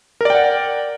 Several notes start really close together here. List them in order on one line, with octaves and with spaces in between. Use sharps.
A#4 D5 G5 F#5